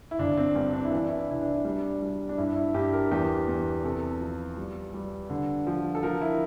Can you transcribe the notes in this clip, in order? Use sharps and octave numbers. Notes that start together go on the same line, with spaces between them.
E4
G1 D4
C4
G2 C4
D4
E4
E3 D4
E4
D4
C2 E4
D4
E4
G3 D4
G3
D4
G2 E4
E4
G2 G4
A#4
E2 G4
E2
C3 A4
F3
G3
G3
D3
F3
A4
F3 A#4
E4